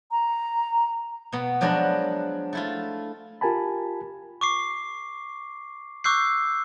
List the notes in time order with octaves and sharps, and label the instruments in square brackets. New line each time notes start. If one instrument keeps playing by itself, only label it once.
[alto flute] A#5
[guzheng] B2 B3
F3 F#3 G#3 D4 F#4 B4
A3 E4 F4
[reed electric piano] F4 G4 A#4 G#5 A5 B5
[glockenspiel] C#6 D6 C7
C#6 D6 E6 F#6 G6 C7